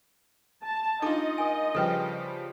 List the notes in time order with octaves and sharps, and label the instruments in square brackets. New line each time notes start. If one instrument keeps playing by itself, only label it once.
[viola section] A5
[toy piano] D4 A4 D6 [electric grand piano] D#4 F4 [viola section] D#5
[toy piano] A#4 G#5
[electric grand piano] C#3 F3 G3 [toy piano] A4 B4 G5